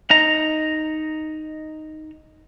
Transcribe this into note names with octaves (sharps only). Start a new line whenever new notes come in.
D#4 A#5